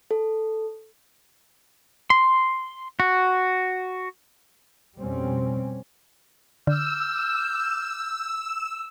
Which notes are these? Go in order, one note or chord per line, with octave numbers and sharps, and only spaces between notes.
A4
C6
F#4
F2 B2 G3 C4 C#4
D3 D6 E6 F6 G6